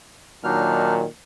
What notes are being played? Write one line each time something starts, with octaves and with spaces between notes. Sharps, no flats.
A#2 D#3 F#3 D4 D#4 F6